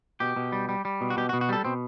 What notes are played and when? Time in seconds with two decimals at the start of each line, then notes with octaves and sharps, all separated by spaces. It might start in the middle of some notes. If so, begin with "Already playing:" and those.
0.20 B2 G4
0.36 B2
0.52 G3
0.69 G3
0.85 G3
1.01 B2
1.10 F#4
1.17 B2 G4
1.29 F#4
1.33 B2
1.41 F#4
1.49 G3 A4
1.65 B2 C4